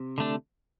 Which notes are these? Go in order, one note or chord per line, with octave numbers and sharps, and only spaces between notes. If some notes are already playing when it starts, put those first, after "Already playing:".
Already playing: C3
D3 A3 D4